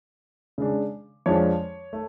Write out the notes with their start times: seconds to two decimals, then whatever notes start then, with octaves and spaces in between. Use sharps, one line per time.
0.58 C#3 G#3 D4
1.26 F2 F3 G#3 D4 C#5
1.93 A3